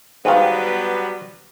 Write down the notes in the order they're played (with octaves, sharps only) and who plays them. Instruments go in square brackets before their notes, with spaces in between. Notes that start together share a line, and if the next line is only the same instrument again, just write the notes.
[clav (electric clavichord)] G#2 D#3 F5 [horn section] F#3 G3 B3